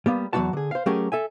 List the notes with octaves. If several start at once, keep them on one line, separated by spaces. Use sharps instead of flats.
G3 A#3 B3
E2 F#3 A#3 D#4 F#4 A5
D3 G#4
C5 F5
F#3 A3 C#4 G4 G#4 A#4
A4 E5 G#5